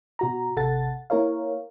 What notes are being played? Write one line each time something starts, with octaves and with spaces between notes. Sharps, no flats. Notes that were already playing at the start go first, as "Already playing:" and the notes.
B2 F#4 A#5
G#1 C3 A4 F#5 A6
A#3 E4 A#4 C#5 F5